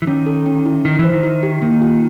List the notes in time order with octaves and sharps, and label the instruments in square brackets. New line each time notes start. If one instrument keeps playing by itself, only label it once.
[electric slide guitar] E3
[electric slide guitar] D#3 [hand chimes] C#4
[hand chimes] A4
C#4
E4
[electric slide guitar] D#3 [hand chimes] E4
[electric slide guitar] E3
[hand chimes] C5
[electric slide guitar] D#3
[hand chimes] E4
G4
[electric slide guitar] D#3 [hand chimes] A#3
[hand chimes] F4